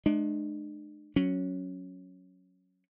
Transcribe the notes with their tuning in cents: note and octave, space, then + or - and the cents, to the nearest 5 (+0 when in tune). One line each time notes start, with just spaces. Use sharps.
G#3 +35 D4 +40
F#3 -5 C#4 +0